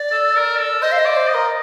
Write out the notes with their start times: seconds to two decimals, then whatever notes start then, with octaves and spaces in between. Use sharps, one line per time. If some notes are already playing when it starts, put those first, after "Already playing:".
Already playing: D5
0.12 A4
0.36 A#4
0.58 A4
0.82 C5 D#5
0.92 F5
0.98 D#5
1.05 D5
1.16 C5
1.29 D#5
1.34 A#4